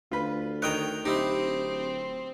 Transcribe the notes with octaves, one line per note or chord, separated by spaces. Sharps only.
D2 F4 B4
D#3 C#5 D#5 G5 A#5 F#6
D1 C4 D#4 E4 G4